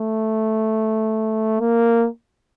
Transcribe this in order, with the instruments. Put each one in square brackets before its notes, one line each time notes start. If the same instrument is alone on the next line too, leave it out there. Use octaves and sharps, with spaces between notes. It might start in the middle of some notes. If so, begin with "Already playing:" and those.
Already playing: [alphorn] A3
A#3